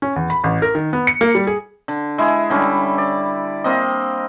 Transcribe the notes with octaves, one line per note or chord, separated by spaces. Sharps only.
C#4
E2
B5
A1
A#4
D#3
B3
C#7
A#3
G3
G#4
D3
G#3 E4 G#4
D3 G3 C#4
D5
A#3 C4 D#5